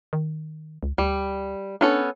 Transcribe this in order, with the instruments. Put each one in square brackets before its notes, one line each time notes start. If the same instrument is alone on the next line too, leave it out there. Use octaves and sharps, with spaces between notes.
[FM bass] D#3
C#2
[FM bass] D2 [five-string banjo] G3
[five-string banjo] B3 C#4 A4 [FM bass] D4